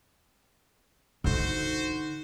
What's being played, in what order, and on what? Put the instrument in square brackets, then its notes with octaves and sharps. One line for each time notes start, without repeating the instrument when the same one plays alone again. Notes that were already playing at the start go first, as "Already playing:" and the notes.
[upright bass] D3 D#4 [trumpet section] F#4 C5